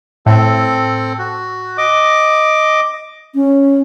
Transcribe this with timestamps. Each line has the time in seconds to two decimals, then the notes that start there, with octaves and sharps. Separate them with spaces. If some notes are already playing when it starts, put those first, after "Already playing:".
0.26 A2 C4 A4
1.19 F#4
1.78 D#5 D6
3.35 C#4